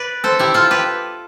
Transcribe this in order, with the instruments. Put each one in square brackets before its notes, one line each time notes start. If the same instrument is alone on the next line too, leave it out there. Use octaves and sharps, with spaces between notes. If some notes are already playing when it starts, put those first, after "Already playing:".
Already playing: [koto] B4 D5
A4 C5
E4 G4
F4 A4
G4 B4